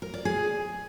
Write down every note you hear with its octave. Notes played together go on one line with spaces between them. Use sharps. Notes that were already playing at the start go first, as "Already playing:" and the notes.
A#4
D5
G#4